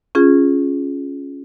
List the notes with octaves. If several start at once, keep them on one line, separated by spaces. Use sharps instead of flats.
C#4 F4 G#4